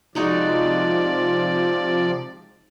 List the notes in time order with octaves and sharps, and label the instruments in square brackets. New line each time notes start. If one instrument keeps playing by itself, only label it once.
[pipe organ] C3 F3 D5 [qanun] G#3 D#4 F#4